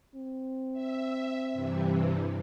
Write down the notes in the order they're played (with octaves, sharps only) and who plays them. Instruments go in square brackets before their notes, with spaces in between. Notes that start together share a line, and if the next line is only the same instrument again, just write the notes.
[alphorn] C4
[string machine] E5
G2 C3 E3